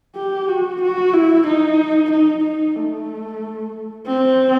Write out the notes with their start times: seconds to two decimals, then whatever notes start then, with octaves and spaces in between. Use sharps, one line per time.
0.16 G4
0.48 F#4
0.81 F#4
1.13 E4
1.47 D#4
2.11 D#4
2.44 D#4
2.76 A3
4.07 C4